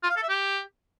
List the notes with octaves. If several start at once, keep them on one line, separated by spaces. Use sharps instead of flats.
F4
F5
A4
E5
G4